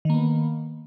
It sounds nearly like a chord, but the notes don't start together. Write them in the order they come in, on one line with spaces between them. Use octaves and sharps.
D#3 A#3 B3